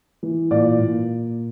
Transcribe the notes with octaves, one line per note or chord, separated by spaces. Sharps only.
E3
A#2 D5
A#2